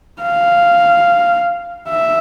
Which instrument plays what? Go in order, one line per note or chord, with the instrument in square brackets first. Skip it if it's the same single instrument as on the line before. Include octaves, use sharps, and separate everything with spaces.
[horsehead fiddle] F5
E5